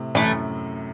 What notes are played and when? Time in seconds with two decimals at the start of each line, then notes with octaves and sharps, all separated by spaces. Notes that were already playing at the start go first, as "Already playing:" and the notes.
Already playing: A2 C3
0.15 F#2 A2 E3 A3